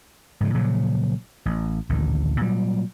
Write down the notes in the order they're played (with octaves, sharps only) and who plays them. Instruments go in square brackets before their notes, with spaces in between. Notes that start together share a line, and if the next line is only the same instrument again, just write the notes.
[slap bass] G#2 C#3 F3
A#2 C#3 F3 F#3
A1
A1 D2 A#2 D#3
A#2 F#3 G3